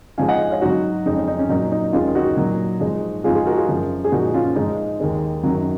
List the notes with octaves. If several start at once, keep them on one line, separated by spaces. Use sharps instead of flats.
G#2 F3 G#3 F5 G#5
D#5 F#5
C#5 F5
G#2 F#3 D#4 F#4
F2 C#3 G#3 D#4
C#4
D#4
C#4
A#2 F#3 D#4
D#4
D#2 D#3 G#3 C#4 F4
D#4 F#4
A#2 F#3
G#2 F3 G#3
G#2 F3 G#3 F4 G#4
F4 G#4
F#4 A#4
F4 G#4
F#2 F3 G#3
G#4
A#2 F3 G#3 D#4 F#4
C#4 F4
G#2 F3 G#3 D#4
D#2 D#3 G#3
F#2 D#3 F#3